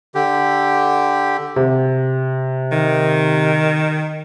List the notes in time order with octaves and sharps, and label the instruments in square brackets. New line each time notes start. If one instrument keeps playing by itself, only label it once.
[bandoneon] D3 G4
[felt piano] C3
[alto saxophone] D#3